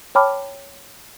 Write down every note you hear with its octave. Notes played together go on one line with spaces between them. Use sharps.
C#5 G5 A5 B5 D6 F6